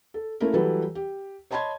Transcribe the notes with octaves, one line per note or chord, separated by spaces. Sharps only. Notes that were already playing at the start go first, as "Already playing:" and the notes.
A4
A3 A#3 C#4 E4 A#4
E3 F#3 G3 A4 B4
G4
C#5 D#5 A5 B5 C6 G#6